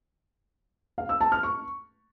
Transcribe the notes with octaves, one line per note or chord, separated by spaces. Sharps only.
F5
E6
A5
F6
C#6